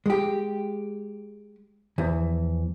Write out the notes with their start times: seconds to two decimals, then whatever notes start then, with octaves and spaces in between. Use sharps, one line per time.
0.06 G#3 G4
1.98 E2 E3 F3